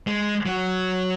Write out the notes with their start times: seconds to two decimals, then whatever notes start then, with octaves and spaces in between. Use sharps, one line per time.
0.07 G#3
0.46 F#3